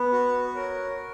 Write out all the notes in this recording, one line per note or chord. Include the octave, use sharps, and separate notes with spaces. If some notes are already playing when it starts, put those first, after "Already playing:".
Already playing: B3 B4
F#4
A#4 C#5